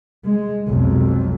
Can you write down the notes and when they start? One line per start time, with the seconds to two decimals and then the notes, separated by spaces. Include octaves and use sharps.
0.25 G#3
0.68 B1 F2